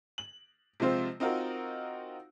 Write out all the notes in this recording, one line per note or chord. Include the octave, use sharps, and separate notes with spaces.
F#7
C3 F3 G#3 C4 F4 C5
C4 D#4 F4 F#4 A#4